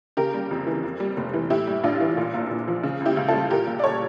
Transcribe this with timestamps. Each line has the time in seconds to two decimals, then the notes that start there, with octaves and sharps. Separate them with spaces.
0.17 C#3 G4 A#4
0.34 G3
0.51 F2
0.67 E3
0.83 F2
1.00 G3
1.17 F1
1.33 E3
1.50 A2 E4 G4
1.67 G3
1.84 A1 D4 F4
2.00 E3
2.17 A#2
2.34 A#1
2.51 A#1
2.68 F3
2.83 C#3
3.00 C#2
3.05 E4 G4
3.17 C#2
3.28 G3 F4 A4
3.50 A#2 G4 A#4
3.67 A#1
3.80 D5
3.84 A4 C#5